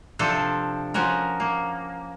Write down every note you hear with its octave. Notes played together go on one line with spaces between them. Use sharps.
C3 F3 D4 A4 C5
F3 C#4 F#4 A#4
A#3